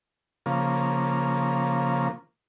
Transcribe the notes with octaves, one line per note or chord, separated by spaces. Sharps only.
C#3 F3 A#3